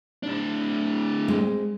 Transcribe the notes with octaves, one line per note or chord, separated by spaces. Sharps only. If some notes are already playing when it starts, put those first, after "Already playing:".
A2 D4
G#3 C4